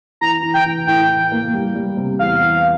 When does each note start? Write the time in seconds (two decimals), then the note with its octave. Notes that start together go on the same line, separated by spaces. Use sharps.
0.21 E3 A#5
0.43 E3
0.54 G5
0.66 E3
0.87 A2 G5
1.09 E3
1.32 A#3
1.54 G3
1.75 G3
1.97 C3
2.19 E2 F5
2.42 E3